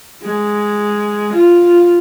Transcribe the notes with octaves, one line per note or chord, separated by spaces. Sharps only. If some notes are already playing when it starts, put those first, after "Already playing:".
G#3
F4